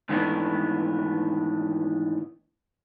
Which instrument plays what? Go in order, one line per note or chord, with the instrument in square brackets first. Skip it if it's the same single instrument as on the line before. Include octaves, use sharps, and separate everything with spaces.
[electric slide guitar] G#2 D#3 E3 A3 B3 D4